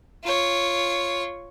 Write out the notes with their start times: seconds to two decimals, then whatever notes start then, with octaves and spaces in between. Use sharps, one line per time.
0.24 F4 C#5